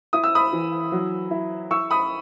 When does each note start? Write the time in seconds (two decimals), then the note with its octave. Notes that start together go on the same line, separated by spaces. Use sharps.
0.13 E4 D#6
0.24 E6
0.35 B5 D#6
0.53 E3
0.92 F#3
1.31 E4
1.71 E4 C#6 E6
1.91 B5 D#6